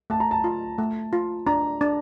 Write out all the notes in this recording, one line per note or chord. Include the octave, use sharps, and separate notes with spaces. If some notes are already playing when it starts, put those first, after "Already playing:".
A3 A5
A#5
A5
F4
A3
F4
D4 A#5
D4